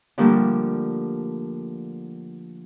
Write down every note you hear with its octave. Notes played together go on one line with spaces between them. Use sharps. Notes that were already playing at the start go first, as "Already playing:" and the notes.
D3 F3 G3 A3 A#3